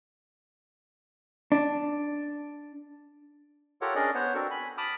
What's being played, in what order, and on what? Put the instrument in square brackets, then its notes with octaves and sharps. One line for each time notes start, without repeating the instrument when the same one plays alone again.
[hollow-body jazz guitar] D4
[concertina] F4 G4 A4 A#4 C#5 F#5
C#4 D4 G#4 A#4 D5 D#5
B3 C5 C#5 F#5
C4 D4 F#4 A4 A#4
G#5 B5
A5 B5 D6 D#6 F6